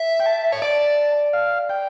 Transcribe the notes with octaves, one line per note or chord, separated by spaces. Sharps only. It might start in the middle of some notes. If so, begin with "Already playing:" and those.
Already playing: E5
G5
A5
C#5
D5 A5
F5
G5